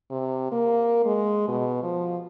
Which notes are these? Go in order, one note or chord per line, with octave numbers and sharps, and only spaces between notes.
C3
A#3
G#3
B2
F3